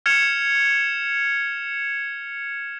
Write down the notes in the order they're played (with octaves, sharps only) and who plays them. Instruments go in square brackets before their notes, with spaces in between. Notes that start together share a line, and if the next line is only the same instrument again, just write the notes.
[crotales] F6 G#6 C#7 E7 F7